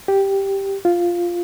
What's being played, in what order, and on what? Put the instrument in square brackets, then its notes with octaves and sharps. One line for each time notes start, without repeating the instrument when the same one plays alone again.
[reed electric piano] G4
F4